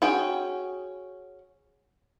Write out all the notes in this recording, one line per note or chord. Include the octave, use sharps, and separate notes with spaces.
C#4 F#4 G#4 G5